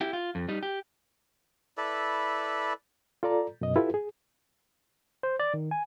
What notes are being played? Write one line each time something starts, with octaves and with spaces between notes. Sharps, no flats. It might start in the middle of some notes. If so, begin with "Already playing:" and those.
E4 G4
F4
F2
G3 D#4
G4
E4 A4 B4 D5
F4 A4 D5 A#5
F#2 B2 D#5
E4 F4 G4 A4 B4
G#4
C5
D5
D#3
G#5